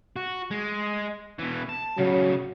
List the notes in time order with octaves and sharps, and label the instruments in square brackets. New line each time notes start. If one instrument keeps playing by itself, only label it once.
[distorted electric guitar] F#4
G#3
B2 E3
A5
[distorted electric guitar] A2 C#3 [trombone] F#3